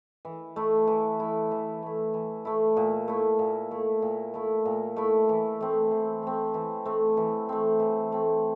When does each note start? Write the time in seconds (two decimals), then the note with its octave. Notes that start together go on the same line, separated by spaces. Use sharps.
0.25 E3
0.56 A3 E4
0.87 E3
1.20 A3 E4
1.51 E3
1.83 A3 E4
2.14 E3
2.45 A3 E4
2.77 A#2
3.08 A3 E4
3.39 A#2
3.71 A3 E4
4.02 A#2
4.34 A3 E4
4.65 A#2
4.96 A3 E4
5.29 E3
5.61 A3 C4
5.91 E3
6.23 A3 C4
6.54 E3
6.86 A3 C4
7.17 E3
7.49 A3 C4
7.80 E3
8.12 A3 C4